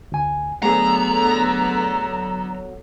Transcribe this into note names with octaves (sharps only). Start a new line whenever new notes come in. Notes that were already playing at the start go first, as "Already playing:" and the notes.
D2 G#5
D3 F#3 A3 B3 G#4 A4 A#5